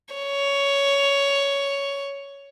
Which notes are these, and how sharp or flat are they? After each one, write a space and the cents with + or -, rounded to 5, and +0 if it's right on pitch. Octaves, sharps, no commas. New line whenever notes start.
C#5 +10